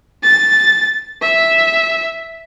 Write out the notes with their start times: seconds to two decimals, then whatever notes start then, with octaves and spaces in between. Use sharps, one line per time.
0.24 A6
1.22 E5